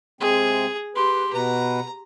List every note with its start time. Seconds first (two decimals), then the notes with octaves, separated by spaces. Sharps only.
0.21 C3 G#3 C4 G#4
0.95 G4 B4 C6
1.33 B2 B4 A#5